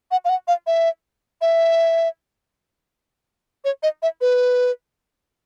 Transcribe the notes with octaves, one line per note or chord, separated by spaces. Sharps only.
F#5
F5
F#5
F5
E5
E5
C#5
D#5
E5
B4